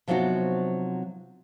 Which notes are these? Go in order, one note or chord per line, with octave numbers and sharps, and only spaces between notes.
C3 F3 F#3 B3 D#4 F#4